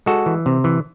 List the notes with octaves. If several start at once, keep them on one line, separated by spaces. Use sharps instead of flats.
G#3 F#4 A4
E3
C3
E3